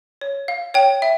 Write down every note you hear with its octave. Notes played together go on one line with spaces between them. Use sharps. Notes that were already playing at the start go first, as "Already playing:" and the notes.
C#5
F5
C#5 G5
E5